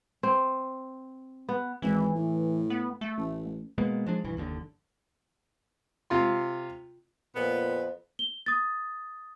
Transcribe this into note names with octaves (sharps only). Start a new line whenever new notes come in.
C4
B3
G#1 E3
A2
B3
A3
A1
B2 G#3 A#3 B3
F3 G#3 D4
B1 G2 E3
F#1 D#2 A#2 D3
C3 F4 C6
F2 A#2 B3
G7
D#6 A6